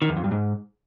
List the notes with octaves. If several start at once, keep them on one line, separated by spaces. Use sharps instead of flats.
D#3
E2
F2
G2
G#2